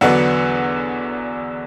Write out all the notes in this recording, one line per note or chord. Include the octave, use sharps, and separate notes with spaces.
E2 D3 F#3 B3 D4 F#5